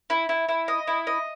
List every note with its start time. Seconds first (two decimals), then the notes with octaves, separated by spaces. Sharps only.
0.10 E4
0.29 E4
0.49 E4
0.68 D#5
0.87 E4
1.07 D#5